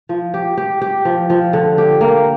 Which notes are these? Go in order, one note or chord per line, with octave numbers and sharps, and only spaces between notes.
F3
G4
G4
G4
F3
F3
D3
G4
A#3